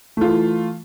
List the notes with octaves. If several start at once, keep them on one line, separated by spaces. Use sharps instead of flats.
E3 A3 F4